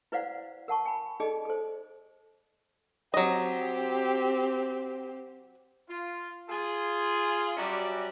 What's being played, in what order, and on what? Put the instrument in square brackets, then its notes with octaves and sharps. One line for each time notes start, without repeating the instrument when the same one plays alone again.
[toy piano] E4 B4 C5 D5 F5 F#5
A#4 F#5 A5 C#6
G#5 B5
D#4 G#4 A4 D5 D#5
A4 C5
[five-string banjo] F#3 D#5 [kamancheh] C4 G4
[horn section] F4
F4 G#4
F#3 G3 C#4 F#4 D5 E5